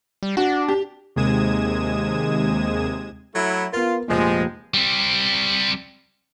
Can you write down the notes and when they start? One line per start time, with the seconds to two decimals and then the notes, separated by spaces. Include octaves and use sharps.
0.23 G3
0.37 D4 F#4
0.68 G4
1.16 D#2 C3 G#3 D#6 G#6 E7
3.34 F#3 A3 E4
3.73 B3 F4 A#4
4.08 F1 A#2 F3 G#3
4.74 G3 C4